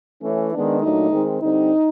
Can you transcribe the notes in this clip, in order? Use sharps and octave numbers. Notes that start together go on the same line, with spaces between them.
E3 A3 C#4
D#3 G#3 B3 D4
A#2 F#3 A3 D4 D#4
D#3 G#3 C4
D3 G3 C4 D#4